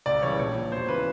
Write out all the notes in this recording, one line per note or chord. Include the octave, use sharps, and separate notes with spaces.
C#2 D5
C#3 E3 G3 C#5
A#1 C#5
A#2 F3
E1 C5
C#3 E3 B4